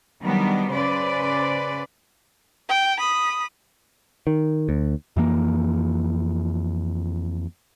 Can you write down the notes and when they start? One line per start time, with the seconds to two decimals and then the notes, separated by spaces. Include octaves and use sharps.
0.22 D#3 F#3 G3 B3 D4
0.70 C#3 B4 C5 D5
2.69 G5
2.99 B5 D#6
4.27 D#3
4.69 D2
5.17 F2 E3 A#3